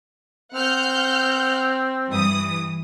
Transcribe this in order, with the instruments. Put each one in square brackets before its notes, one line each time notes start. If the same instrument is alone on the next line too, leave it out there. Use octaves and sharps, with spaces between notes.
[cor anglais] C4 [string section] F#5 F6 G6
[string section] G2 E3 D#6